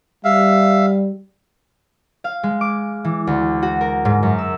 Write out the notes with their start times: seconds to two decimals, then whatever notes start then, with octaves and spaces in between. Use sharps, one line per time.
0.25 G3 E5 F5
2.24 F5
2.43 G#3
2.61 D6
3.04 E3
3.27 D2
3.62 F#4
3.81 A#4
4.05 G#2
4.23 F#2
4.38 E6